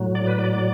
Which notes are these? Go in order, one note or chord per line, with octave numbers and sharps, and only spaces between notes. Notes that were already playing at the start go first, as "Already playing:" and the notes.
Already playing: A2 F#3
D5
B4
D5
D5